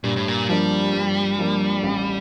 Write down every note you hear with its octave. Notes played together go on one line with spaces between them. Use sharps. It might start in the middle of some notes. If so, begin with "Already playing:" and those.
G2 A#2
A2
A#2
F3 G3 A#3 D4
G2
F3 A#3 D4
A1